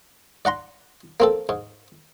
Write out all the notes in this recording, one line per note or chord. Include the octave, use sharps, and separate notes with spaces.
D5 F#5 A#5 C6
A#3 C4 A4
G#2